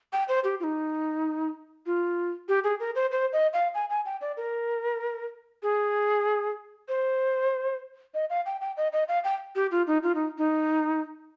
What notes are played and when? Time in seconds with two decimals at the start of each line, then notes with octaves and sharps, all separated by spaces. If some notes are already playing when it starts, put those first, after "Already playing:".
0.13 G5
0.28 C5
0.44 G4
0.60 F4
0.64 D#4
1.86 F4
2.49 G4
2.64 G#4
2.80 A#4
2.95 C5
3.11 C5
3.33 D#5
3.53 F5
3.74 G#5
3.90 G#5
4.06 G5
4.21 D5
4.37 A#4
5.63 G#4
6.88 C5
8.14 D#5
8.30 F5
8.46 G5
8.61 G5
8.77 D#5
8.93 D#5
9.08 F5
9.24 G5
9.55 G4
9.71 F4
9.87 D#4
10.03 F4
10.15 D#4
10.38 D#4